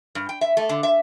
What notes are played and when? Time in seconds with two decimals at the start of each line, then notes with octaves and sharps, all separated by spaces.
0.15 G2
0.29 G5
0.41 E5
0.57 A3
0.69 D3
0.83 E5